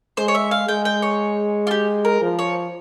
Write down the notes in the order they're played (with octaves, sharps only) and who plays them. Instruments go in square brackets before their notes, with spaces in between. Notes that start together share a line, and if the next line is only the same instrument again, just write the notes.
[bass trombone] G#3 [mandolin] C5
[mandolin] C#5
E5
F5
[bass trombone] G#3 [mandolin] G5
[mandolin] G5
C#5
F4
G4
A#4
[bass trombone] F3
[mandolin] C#5